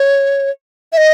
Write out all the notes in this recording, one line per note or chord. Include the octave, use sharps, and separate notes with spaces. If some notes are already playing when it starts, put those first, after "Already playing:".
Already playing: C#5
E5
D#5